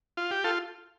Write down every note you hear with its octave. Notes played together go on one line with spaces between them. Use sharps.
F4
G4
F4 A4